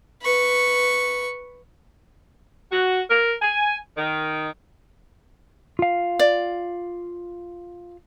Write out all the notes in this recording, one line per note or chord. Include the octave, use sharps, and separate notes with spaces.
B4 C#6
F#4
A#4
G#5
D#3
F4 F5
D5